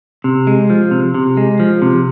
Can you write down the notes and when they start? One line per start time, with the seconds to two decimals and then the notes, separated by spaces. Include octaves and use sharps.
0.24 C3
0.47 G#3
0.70 F3
0.91 C3
1.14 C3
1.37 G#3
1.60 F3
1.82 C3